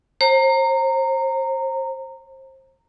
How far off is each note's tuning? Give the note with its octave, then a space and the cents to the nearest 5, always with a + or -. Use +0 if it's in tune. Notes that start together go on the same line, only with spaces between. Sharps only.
C5 +30 A#5 -20